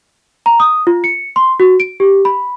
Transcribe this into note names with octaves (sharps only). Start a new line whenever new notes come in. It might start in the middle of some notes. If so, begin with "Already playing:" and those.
A#5
D#6
F4
C#7
C6
F#4
D7
G4
B5